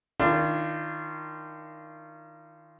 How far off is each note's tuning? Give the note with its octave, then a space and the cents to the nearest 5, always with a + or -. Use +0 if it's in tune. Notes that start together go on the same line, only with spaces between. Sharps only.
D#3 +0 D4 +10 F4 -30